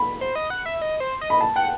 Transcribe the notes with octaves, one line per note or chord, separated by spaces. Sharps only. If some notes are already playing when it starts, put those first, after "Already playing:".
Already playing: B5
C5
D#5
F#5
E5
D#5
C5
D#5
B5
A5
F#5 G5